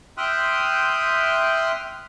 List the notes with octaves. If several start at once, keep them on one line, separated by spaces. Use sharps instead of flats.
E5 G5 C6 D#6 F6 F#6